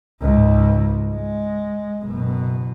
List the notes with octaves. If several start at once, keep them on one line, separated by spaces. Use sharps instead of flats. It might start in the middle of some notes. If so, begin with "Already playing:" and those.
C#2 G#2
G#3
F#1 B2